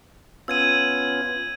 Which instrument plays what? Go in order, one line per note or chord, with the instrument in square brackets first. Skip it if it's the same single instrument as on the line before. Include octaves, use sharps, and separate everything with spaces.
[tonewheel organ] B3 C#4 F4 [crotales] E6 G#6 D#7